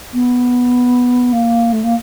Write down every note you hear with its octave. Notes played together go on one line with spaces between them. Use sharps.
B3
A#3
A3
A#3